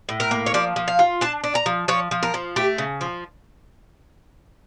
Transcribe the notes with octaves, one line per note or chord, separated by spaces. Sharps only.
A2
A#4
A#3
C#5
F3 D5
F3
F5
F4
D4 A5
D4
A#5
F3
F3 C#5
F3
A#4
F3
A3 G4
C#3
F3